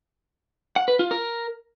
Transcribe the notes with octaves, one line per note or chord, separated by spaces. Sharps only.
F#5
B4
F4
A#4